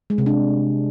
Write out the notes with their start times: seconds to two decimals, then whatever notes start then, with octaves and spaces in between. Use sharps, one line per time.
0.10 G#3
0.18 C3
0.26 D4